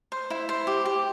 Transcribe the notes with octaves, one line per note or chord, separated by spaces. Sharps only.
C5
E4
C5
G4
G4